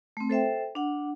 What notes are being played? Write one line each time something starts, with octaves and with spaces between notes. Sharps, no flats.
A3 C4
A4 C5 E5 G5
D4 F#5